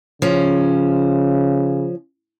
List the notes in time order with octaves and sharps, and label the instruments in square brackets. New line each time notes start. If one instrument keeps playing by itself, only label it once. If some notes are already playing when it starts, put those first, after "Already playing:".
[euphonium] C#3 [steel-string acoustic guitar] F3 C#4